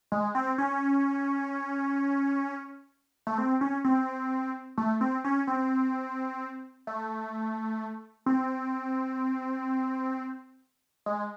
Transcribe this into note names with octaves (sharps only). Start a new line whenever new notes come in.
G#3
C4
C#4
A3
C4
C#4
C4
A3
C4
C#4
C4
A3
C4
G#3